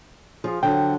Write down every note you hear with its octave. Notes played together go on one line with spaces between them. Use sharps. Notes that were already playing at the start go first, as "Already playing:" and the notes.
F3 F4 G#4
D3 F3 F#3 G5